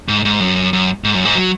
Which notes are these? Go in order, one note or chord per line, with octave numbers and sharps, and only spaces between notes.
G#2
G#2
F#2
F#2
G#2
F#2
G#2
F#3